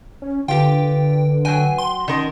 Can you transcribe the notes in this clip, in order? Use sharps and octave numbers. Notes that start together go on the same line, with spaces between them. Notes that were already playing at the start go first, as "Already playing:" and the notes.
C#4
D3 F4 G4 B4 G5
F#3 G5 G#5
C6
D#3 C#4 A#4